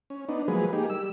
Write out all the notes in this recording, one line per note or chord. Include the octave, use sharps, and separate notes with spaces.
C#4
B3 D4 D#4
F3 F#3 G#3 A#3 G#4 B4
A#3 D#4 G4 G#4
G3 E6